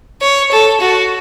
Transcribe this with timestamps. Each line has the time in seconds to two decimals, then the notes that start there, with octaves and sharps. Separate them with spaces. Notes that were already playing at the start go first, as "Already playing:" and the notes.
0.22 C#5
0.51 A4
0.81 F#4